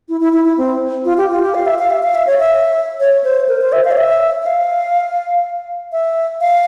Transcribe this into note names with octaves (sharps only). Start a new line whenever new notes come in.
E4
E4
E4
E4
C4
F4
G4
F4
G4
F5
E5
F5
E5
F5
E5
C#5
E5
C#5
C5
A#4
C5
E5
F5
C#5
E5
E5
F5
E5
F5